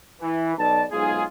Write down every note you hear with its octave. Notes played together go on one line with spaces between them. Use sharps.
E3
B1 B2 D5 A5
B1 G#2 G#3 F4 G#4